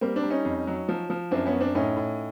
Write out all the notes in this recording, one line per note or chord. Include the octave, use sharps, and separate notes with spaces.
G3 A#3 C4
C4 D4
G3
C#4 D#4
F2
F#3
F3
F3
F#2 C4 D4
B3 C#4
F#2
C4 D4
A2 C#4 D#4
A2